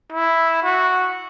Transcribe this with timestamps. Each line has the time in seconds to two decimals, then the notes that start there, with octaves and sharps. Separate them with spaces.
0.12 E4
0.63 F#4